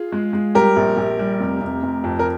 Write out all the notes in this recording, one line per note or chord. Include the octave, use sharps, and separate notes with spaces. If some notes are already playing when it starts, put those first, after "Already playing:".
Already playing: F4 G#4
G#3
G#3
G3 G4 A#4
A#1
A#1
G3
F1
F1
F1
F2
A#4